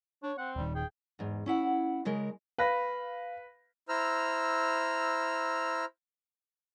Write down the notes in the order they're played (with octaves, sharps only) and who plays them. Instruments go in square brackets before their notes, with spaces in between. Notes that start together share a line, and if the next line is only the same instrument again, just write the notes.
[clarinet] D4 [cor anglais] C#5
[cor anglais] C4 [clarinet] F#5
[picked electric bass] D#1 D#3 [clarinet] G3
[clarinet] G#4 [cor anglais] G5
[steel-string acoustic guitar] E2 G#2
C#4 E4 F#5
C#3 G#3 A#4
[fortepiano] B4 [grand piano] F5 A#6
[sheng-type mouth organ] E4 C5 A#5 E6 F6